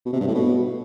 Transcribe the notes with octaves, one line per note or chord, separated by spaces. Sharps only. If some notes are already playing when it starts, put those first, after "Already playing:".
B2
C3
G2
A2
B2